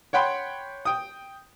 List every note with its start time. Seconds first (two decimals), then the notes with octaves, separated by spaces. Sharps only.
0.13 C#5 F#5 G5 B5 C6
0.85 G5 D#6